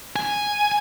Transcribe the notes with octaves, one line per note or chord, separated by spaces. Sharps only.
G#5